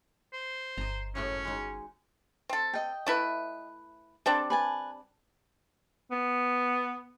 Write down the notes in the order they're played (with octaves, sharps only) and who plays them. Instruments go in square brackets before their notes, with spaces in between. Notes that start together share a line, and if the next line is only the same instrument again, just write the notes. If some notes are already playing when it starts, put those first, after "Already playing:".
[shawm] C5
[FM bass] G1 [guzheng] D#5 A#5
[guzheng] F#2 A2 A3 [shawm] C#4
[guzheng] G#3 D#4
[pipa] C4 A4
[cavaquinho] D#5 G5
[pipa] A3 E4 B4
[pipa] G3 C4 D4 [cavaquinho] A4
[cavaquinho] B4 G#5 A5
[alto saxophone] B3